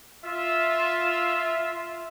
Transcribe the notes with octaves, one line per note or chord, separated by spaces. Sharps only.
F4 E5